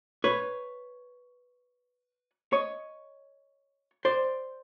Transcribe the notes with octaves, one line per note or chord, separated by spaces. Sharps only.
B4 C#5
C#5 D#5
C5 D5